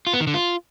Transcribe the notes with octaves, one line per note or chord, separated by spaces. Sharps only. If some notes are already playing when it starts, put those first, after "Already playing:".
F4
B3
D#3
D3
F4